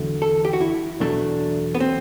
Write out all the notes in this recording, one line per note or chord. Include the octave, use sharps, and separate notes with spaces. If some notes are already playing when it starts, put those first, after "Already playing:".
Already playing: E2 D3 F#3 A3
A4
G4
F#4
E4
E2 B2 F#3 A3 D4
B3
C4